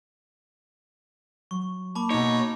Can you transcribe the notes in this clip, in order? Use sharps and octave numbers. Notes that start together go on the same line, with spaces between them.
F#3 C#6
A#3 A5 B5 D6
B2 D#4 C#5